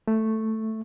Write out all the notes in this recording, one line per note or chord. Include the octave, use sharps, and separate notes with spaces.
A3